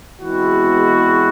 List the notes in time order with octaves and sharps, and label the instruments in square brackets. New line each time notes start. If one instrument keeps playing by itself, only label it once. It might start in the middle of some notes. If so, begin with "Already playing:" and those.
[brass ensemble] E2 B2 G#3 C4 E4 F#4